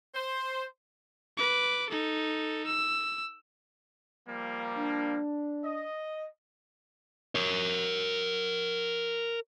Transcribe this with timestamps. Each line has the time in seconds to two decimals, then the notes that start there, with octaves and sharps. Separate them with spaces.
0.15 C5
1.37 B4 D6
1.90 D#4 A4
2.66 E6
4.27 F3 G3 A#3
4.75 D4
5.64 D#5
7.35 A#4 C#5